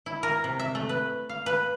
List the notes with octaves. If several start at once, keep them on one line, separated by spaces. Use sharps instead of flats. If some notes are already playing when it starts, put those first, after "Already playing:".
E4
A#4
C3
E5
A3
B4
F5
B4